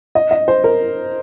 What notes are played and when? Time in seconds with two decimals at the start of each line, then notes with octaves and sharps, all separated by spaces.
0.15 D#5
0.31 D#5
0.48 C5
0.64 A#4